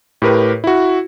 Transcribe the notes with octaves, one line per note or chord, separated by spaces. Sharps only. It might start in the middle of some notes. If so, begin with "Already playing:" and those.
A2 G4 A#4 B4
E4 F#4